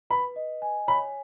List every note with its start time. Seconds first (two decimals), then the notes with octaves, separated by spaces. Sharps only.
0.10 B4 B5
0.36 D#5
0.62 G#5
0.88 C#5 B5